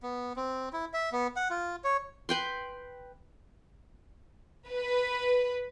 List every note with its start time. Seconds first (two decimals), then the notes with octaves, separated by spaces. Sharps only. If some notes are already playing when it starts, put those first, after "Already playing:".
0.03 B3
0.36 C4
0.73 E4
0.94 E5
1.12 B3
1.36 F#5
1.50 F4
1.84 C#5
2.29 B4 G5 C6
4.69 B4